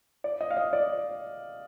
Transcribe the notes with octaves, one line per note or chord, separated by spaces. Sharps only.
D5
D#5
F5
D#5
D5